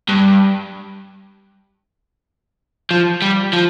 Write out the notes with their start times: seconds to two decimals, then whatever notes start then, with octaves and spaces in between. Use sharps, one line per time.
0.08 G2
2.91 F3
3.22 G3
3.53 F3